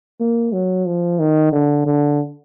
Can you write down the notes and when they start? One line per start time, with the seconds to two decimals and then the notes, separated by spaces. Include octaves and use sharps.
0.20 A#3
0.53 F#3
0.86 F3
1.19 D#3
1.53 D3
1.86 D3